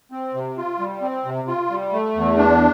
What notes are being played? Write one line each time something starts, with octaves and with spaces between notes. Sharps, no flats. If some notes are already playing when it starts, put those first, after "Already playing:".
C4
C3
F4
G3
C4
C3
F4
G3
A3
E2
D4